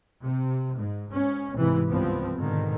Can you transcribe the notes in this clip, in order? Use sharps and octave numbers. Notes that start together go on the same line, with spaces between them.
C3
G#2
G#2 C#4
G#2 C3 E3
C#2 G2 F3 B3 C4
G#2 B2 D3 D#3